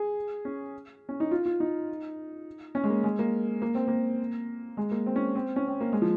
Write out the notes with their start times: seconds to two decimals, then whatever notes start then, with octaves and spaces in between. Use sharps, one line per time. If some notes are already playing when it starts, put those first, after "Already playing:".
Already playing: G#4
0.45 C#4
1.09 C#4
1.20 D#4
1.31 F4
1.46 F4
1.60 D#4
2.75 C#4
2.84 G#3
2.90 A#3
3.04 G#3
3.19 A#3
3.62 A#3
3.75 C4
3.88 A#3
4.77 G#3
4.91 A#3
5.06 C4
5.16 C#4
5.35 C4
5.56 C#4
5.68 C4
5.80 A#3
5.92 G#3
6.02 F3